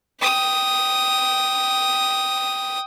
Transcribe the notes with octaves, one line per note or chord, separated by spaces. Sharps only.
G5 D#6